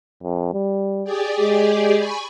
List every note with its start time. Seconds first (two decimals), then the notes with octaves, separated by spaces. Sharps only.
0.23 F2
0.53 G3
1.04 G4 G#4 D5
1.40 G#3
1.97 G#5 B5 C#6